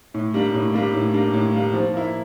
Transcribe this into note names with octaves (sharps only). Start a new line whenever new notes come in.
A2
G3 A#3 D4
A2
G3 A#3 D4
A2
G3 A#3 D4
A2
G3 A#3 D4
F3
A#3 E4